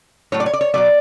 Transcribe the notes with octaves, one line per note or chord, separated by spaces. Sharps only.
A2 F#3 A3 C#5
D5
C#5
D5
C#5
B2 F#3 A3 D5